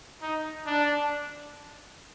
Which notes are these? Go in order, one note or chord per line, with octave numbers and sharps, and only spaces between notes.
D#4
D4